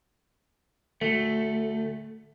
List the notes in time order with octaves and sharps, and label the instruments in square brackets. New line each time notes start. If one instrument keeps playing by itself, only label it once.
[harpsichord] D2 [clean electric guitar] A3